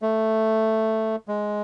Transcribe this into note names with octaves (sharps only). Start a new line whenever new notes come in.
A3
G#3